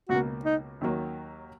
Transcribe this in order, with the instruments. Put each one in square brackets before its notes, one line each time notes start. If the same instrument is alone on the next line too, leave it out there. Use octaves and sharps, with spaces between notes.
[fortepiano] C#2 B2 A#3 [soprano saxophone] F#4
[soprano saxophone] D#4
[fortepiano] D#2 D#3 F#3 A#3